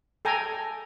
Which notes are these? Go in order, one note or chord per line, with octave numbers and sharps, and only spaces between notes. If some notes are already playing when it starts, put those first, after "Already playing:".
A4 G5 G#5 A#5